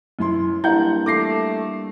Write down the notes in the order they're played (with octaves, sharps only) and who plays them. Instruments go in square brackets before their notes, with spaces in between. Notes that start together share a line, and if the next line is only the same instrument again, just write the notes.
[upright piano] F#2 E4 C6
[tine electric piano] G3 A#3 D4 [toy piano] E4 [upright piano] F#5 G6
[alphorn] A3 [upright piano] D6 A#6 C7